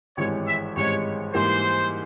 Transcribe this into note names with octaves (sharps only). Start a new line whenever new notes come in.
G#1 G2 E3 G#3 C#4 C#5
E5
G#1 G2 E3 G#3 C#4 C#5
G#2 E3 G3 A#3 C5